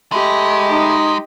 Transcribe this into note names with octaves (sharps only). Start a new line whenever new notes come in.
G#3 A3 G4 D#5 B5
D#4